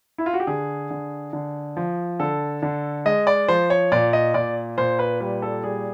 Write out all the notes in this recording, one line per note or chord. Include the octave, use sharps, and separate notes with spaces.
E4
F4
F#4
G4
D3 G#4
D3
D3
F3
D3 A4
D3
G#3 D#5
D5
F3 C5
C#5
A#2 D5
D#5
A#2 D5
A#2 C5
B4
G3 B4
A4
G3 G#4